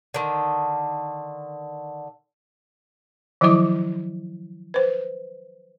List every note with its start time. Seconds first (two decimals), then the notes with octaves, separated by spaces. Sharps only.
0.14 D3 D#3
3.41 D#3 F3 F#3 E4 D6
4.74 B4 C5